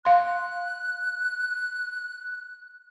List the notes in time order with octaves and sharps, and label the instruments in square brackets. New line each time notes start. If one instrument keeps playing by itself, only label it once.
[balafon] F5 C6 [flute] F#6